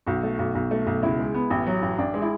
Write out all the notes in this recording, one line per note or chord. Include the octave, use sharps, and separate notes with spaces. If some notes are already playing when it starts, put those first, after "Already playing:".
B1 F#4
A3
B1
B1
A3
B1
C#2 E4
G#3
B3
A1
F#3
A1
A1 D4
G#3
E4